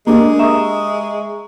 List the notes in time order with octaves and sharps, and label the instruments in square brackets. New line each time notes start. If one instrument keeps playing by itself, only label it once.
[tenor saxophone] G#3 [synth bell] A#3 D4 [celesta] G4 A#4
[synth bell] E5 [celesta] A#5 C#6 D#6